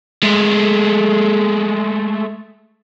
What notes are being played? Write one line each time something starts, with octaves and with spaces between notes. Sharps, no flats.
G#3 A3